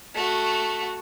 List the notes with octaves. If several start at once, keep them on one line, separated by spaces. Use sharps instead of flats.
A3 F#4